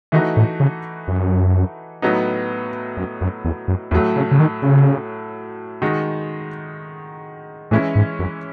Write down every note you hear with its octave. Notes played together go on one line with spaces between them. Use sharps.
D#3 E3 A3 D#4 F#4
A2
C#3
F#2
A2 F#3 B3 D#4
F#2
F#2
E2
F#2
E2 A2 F#3 A3
C#3
C#3
D#3
C#3
D#3 G#3 D#4 F#4
A2 E3 G#3 C#4 E4
G#2
F#2